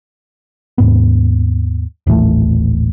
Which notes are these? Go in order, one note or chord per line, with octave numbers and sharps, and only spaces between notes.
D#2 G#2 B3
D#1 A1 E3 A3